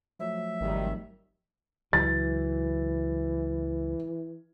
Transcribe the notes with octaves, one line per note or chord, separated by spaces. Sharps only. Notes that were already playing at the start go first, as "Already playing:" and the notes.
F3 F#3 A3 E5
G#1 D#3 G3
C#2 E3 F#3 A6